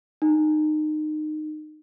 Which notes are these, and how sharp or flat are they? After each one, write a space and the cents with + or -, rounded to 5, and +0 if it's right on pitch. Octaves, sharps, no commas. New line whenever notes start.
D#4 -25